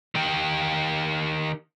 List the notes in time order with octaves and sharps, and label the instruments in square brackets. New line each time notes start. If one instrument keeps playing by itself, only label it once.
[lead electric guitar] D#3 G4